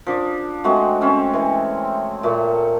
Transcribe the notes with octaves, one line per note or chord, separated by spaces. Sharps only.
F3 D4
G#3 A3 C4 F#4
C4 C#4 E5
E3
A#2 A3